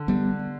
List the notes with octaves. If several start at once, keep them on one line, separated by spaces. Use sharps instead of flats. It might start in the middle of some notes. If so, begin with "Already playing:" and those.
Already playing: D3
G3 B3